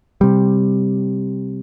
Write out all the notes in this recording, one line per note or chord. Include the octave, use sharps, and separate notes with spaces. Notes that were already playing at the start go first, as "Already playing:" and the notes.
C3 G3